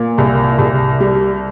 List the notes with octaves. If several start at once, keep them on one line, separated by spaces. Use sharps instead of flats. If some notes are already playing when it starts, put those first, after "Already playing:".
Already playing: A#2
C2
C2
G3